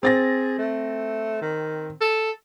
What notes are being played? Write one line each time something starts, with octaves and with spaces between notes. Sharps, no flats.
C4 G#4 A6 A#6
A3
D#3
A4